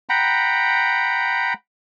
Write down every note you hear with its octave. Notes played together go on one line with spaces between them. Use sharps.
F#5 G5 A#5 B5